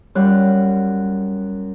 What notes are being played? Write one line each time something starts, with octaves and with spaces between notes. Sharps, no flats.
F#2 G3 F4 F#5 F#6